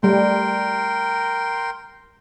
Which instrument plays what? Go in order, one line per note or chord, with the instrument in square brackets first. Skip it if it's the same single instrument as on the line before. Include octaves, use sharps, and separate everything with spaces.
[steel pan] G3 A3 [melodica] A#4 G5 C6